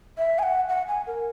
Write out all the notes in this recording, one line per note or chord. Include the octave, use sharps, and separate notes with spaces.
E5
G#5
F#5
F#5
G#5
A#4